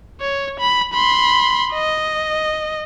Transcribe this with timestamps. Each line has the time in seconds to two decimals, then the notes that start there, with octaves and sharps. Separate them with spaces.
0.21 C#5
0.60 B5
0.93 B5 C6
1.73 D#5